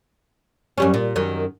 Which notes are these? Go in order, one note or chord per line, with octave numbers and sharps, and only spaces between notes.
F#2 G3 C#4
A#2
F#2 D#3